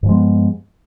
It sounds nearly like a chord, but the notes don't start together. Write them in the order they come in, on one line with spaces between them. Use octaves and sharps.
G2 F3 G#3 B3